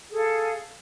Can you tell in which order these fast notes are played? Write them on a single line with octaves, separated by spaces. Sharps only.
G#4 A4 F5